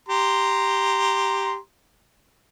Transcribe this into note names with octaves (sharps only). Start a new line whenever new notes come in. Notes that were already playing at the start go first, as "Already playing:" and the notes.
G4 A#5 C6